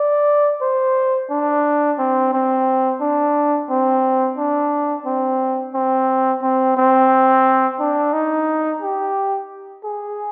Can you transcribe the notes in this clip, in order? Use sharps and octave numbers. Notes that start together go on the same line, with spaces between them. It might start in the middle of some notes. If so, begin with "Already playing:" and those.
Already playing: D5
C5
D4
C4
C4
D4
C4
D4
C4
C4
C4
C4
D4
D#4
G4
G#4